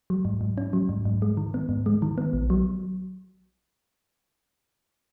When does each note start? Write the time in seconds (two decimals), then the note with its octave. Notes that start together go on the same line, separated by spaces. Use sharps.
0.10 F#3
0.25 G#2
0.41 G#2
0.58 C#4
0.73 F#3
0.89 G#2
1.05 G#2
1.22 G#3
1.37 D#3
1.54 B3
1.69 G#2
1.86 G#3
2.02 D#3
2.18 B3
2.33 A#1
2.50 F#3